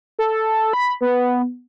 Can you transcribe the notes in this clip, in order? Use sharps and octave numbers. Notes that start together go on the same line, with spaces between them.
A4
B5
B3